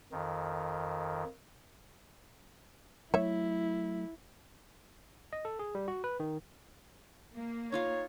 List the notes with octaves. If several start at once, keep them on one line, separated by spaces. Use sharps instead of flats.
F2 D#3
F#3 A3 E4 C#5 E5
D#5
A4
G#4
G3
F#4
B4
D#3
A#3
D#4 F4 C#5 F5